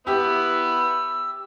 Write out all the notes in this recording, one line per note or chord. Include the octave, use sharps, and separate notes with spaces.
B3 E4 G4 B4 E6